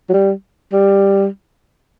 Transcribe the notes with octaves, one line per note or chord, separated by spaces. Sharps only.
F#3
G3
G3